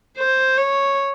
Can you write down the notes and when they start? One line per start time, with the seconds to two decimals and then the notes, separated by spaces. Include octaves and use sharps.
0.17 C5
0.57 C#5